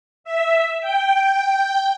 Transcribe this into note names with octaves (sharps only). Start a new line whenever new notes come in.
E5
G5